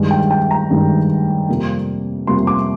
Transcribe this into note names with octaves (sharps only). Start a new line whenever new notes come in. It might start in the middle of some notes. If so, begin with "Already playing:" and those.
Already playing: G2 D#3 G#3
G5
G5
A#5
G2 D#3 G#3
F2 C3 G3 A#3
F2 C3 G3 A#3 C6
D6